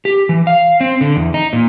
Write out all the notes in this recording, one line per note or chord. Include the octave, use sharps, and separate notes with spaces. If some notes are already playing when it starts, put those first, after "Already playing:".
G4
E3
F5
C4
D3
E2
D#4
A#2